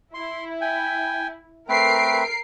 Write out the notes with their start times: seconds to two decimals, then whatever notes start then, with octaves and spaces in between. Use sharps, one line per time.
0.14 E4 C6
0.61 G5 G#5
1.69 A3 C4 A#4 B4 C7 D7